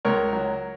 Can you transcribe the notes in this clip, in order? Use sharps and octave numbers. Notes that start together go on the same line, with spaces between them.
C#2 A#4 C#5
F#3